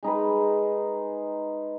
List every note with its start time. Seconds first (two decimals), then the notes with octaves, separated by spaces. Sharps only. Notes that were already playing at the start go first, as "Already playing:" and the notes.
0.03 G#3 D#4 G#4 B4